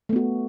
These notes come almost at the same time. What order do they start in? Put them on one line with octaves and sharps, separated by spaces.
A3 B3 F#4